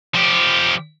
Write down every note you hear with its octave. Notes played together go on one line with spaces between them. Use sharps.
F3 G4